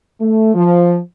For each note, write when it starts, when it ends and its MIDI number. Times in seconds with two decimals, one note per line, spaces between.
0.20 0.51 57
0.54 0.96 53